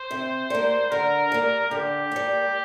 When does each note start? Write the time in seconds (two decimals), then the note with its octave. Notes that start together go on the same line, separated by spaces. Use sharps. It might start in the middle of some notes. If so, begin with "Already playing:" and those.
Already playing: C5
0.11 C3
0.50 G3 A#3
0.91 D3 A#4
1.32 G3 A#3
1.71 D3 G4
2.11 G3 A#3